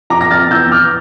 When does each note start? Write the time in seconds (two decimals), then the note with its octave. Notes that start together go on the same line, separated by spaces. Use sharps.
0.10 F2 A#5 D6
0.21 A#6
0.31 F2 F6 A6
0.51 E2 E6 G6
0.71 E3 D6 F6